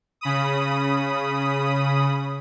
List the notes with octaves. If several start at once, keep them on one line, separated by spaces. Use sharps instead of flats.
C#3 B5 D#6